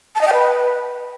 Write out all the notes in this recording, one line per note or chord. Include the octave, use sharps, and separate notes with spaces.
A5
D#5
G5
B4